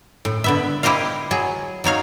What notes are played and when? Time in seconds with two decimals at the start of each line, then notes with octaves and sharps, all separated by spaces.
0.25 A2
0.44 D3 B3 E5
0.83 E4 G4 C5 D#5 F5
1.31 F#3 G#4
1.84 F#3 D#4 C#5 F5